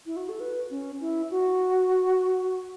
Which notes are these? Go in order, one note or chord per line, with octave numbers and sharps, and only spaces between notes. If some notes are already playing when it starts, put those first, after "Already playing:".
E4
F#4
A4
B4
C#4
E4
F#4